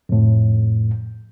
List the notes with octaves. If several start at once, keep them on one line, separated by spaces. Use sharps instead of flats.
F2 A2